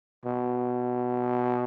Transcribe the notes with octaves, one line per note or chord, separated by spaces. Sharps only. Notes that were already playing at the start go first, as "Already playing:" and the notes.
B2